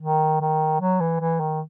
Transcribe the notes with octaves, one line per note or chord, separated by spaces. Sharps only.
D#3
D#3
F#3
E3
E3
D#3